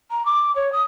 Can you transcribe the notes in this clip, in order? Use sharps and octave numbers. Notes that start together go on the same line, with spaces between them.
A#5
D6
C#5
D#6